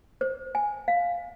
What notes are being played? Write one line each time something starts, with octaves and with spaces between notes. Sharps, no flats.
C5
G#5
F5